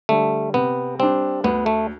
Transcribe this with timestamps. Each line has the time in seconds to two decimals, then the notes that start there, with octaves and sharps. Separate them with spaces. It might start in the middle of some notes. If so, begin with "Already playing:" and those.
0.09 D3 G3 A3
0.54 C3 B3
0.99 G3 C4 D4
1.44 D2 B3
1.66 A3